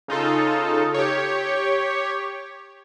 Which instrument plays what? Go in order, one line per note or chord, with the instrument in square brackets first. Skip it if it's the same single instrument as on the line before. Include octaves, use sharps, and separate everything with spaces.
[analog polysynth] C#3 D#4 F4 A4
G4 C#5